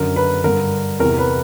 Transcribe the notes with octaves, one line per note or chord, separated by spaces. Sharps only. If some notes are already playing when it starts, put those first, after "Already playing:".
Already playing: F#2 D3 A#4
B4
G2 D3 A#4
E2 C3 E3 A#4
B4